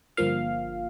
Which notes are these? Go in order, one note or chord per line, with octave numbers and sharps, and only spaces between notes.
G1 G2 F3 A#3 F5